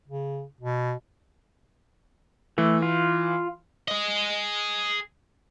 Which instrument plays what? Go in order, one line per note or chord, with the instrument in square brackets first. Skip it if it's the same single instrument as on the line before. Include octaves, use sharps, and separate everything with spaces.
[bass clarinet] C#3
B2
[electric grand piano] E3 [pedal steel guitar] A3
[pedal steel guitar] F4
[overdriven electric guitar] G#4 D#5